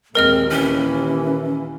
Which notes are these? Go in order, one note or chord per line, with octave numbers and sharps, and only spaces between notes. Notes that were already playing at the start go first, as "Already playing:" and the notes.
D#2 A#2 G#3 C4 A#4 D#5 F6
E3 C#4